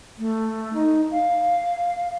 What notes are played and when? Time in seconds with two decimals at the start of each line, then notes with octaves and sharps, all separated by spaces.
0.19 A3
0.74 D#4
1.11 F5